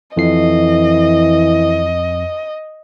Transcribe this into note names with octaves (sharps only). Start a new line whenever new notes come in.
F2 E3 D#5 C7